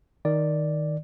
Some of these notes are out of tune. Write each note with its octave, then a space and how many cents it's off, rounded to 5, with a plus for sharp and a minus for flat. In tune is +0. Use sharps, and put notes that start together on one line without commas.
D#3 +0 D5 +0